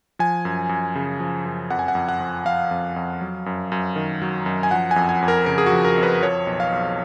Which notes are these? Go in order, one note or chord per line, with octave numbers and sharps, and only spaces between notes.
F3 G#5
F#2
F#2
C#3
F3
F#2
F2 F#5
G#5
F#5
F2
F#5
F3
F3 F5
F2
F2
F#3
F#2
F#2
D#3
F#3
F#2
G#5
F3 F#5
G#5
F2
G#5
F2
A#4
C#3 A#4
G#4
F#4
F3
A#4
F2
B4
F3 C#5
B1
F5
B1